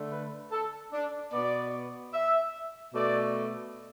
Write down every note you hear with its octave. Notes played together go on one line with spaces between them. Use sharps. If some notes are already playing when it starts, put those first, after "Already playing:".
Already playing: D3 A3
B4
A4
D4
B2 B3 D5
E5
B2 A3 D5